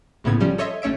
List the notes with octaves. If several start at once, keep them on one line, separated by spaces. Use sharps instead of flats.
A#1 A2 C#3 B3 G#6
F3 G3 C#4
A4 C#5 D#5 E5 C6
G1 A3 C#4 C#5 E5 D7